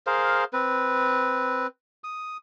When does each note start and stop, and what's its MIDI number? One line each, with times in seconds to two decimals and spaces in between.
0.07 0.44 68
0.07 0.44 70
0.07 0.44 72
0.07 0.44 77
0.53 1.67 60
0.53 1.67 71
2.04 2.37 87